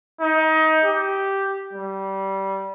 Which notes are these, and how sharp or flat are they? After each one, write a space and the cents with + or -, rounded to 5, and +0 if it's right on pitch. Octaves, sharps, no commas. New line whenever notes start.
D#4 +20
G4 -5
G3 -20